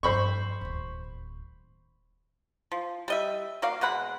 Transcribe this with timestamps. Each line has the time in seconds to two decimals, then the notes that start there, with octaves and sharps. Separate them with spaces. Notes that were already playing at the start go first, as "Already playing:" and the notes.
0.03 G2 F3 C5 B5 C#6
0.61 D1 D#2
2.72 F3
3.08 G3 D#5 E5
3.62 A#3 F#4 D5 F5
3.81 B2 G#3 F#5 B5